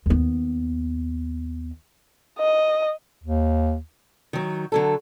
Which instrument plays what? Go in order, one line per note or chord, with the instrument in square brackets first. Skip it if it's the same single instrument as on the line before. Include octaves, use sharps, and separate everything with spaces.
[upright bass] D#2 B3
[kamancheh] D#5
[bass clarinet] D#2
[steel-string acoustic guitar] D#3 F#3
D3 F#3 A4